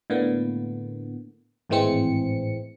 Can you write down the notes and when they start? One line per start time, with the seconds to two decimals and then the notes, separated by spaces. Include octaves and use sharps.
0.10 A2 D3 A#3 B3
1.69 G#1 A2 E3 G#3 C4 C#7